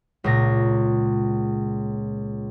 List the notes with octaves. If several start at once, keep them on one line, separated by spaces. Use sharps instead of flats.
C#2 A#2 A#6